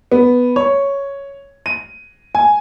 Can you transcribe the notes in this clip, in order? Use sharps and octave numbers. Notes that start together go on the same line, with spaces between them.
B3
C#5
D#7
G#5